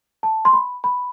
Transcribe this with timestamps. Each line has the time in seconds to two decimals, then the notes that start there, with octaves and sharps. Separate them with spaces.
0.23 A5
0.45 C6
0.53 B5
0.84 B5